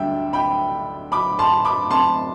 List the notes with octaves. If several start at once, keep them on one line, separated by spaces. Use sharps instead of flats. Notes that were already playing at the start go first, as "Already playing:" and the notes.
Already playing: D2 D3 G3 D4 E5 G5
G5 B5
B5 D6
A5 C6
B5 D6
A5 C6